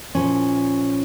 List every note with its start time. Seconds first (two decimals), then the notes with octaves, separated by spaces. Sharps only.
0.15 A#2 F3 C#4